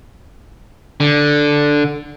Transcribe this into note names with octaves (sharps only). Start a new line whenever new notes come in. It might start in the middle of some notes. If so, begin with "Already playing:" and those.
D3